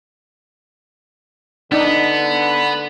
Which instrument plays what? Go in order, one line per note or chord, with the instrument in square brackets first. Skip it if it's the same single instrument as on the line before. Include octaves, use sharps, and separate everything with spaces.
[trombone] D3 [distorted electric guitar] B3 [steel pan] D4 D#4